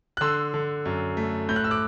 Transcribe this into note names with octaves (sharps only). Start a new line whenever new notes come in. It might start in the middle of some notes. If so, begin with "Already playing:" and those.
F#6
D3 C6 E6
D3
F#2
A3
A2 G6
F#6
E6
D6 F#6